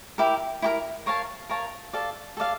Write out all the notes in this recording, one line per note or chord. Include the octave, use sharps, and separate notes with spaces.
E4 G4 A#4
E4 G4 A#4
A#4 C#5 F5 A5
A#4 C#5 F5 A5
A4 D5 F5
A4 D5 F5